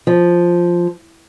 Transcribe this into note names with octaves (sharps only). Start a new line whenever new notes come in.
F3